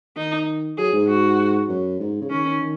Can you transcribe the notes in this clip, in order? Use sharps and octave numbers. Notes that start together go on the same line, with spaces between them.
D#3 D#4
F#3 G#4
G#2
F#4
F#2
G#2
C#3
D#3 C#4
D#3
D#3